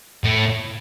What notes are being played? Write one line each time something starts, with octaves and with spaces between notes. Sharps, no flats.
A2